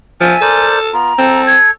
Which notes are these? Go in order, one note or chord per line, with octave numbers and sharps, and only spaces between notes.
F3 E5 G#5 A5
A4 A#4 C5 D5
B3 F4 A#5
C4 A4
G#6